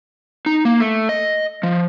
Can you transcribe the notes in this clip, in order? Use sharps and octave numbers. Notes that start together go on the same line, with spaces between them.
D#4
A#3
A3
D#5
F3